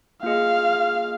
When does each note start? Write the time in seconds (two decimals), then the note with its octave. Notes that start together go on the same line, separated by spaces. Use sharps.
0.23 A#3 F4 G#4 D#5 F5